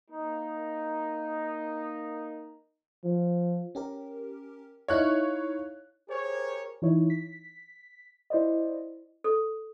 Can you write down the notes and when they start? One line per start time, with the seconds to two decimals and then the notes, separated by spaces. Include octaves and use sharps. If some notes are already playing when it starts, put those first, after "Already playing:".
0.10 A#3 D#4
3.04 F3
3.75 C#4 G4 A#4
4.88 D#4 E4 C#5 F5 F#6
6.09 G4 G#4 A#4 C5 C#5
6.82 E3 D#4 E4 C#5
7.10 B6
8.30 E4 C5 D5 D#5
9.24 A4